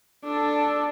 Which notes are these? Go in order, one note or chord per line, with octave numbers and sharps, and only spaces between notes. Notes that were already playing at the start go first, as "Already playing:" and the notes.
D4 A4